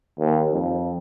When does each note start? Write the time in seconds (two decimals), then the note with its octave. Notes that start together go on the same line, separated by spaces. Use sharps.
0.20 D#2
0.54 F2